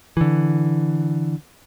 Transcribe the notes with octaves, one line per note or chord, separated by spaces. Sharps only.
D3 E3